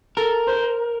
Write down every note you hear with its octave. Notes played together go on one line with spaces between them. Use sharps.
A4 A#4
C5